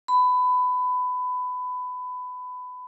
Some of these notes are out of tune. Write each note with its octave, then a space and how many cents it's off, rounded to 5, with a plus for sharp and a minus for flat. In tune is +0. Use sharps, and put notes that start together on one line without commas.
B5 +20